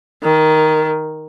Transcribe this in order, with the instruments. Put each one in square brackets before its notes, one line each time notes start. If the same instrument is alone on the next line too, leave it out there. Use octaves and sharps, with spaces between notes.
[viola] D#3